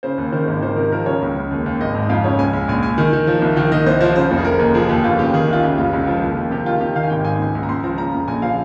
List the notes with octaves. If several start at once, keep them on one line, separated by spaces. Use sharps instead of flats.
C#3 C5
D#2
D#3 C5
G#1 A#4
D#3 C5
C3 A#4
F3 A#4
C#3 C#5
C#2
C#2
D#2
D#2
G#1 D#5
G#2
F2 F5
C#3 C#5
C#2 G#5
C#2
A#1 G#5
A#1 G#5
D#3
D#3
F3
C2
D#3 G5
D#3 D#5
C2 C5
F3 C5
C#3 C5
F1
G#4
F1 A#4
D#2
F3 G#4
D#2 G4
G1 F4
C#3 G4
D#3 G#4
C2
F4
C#3 G4
F1 F4
C#2
F3
D#2
D#2
C3 G4
D#3 F4
C3 G4
D#3 F5
G#5
G#1 G5
G#2 G#5
C#2
C#2
A#5
C#2 C6
F3 A#5
C#3 A#5
F1
A#1 G#5
F3 F5